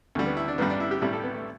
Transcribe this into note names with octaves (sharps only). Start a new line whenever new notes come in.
D2 D3 G3
B3
E4
D4
A1 G2 G3 B3
D4
E4
G4
B1 A2 G3 G4
A4
B3
A3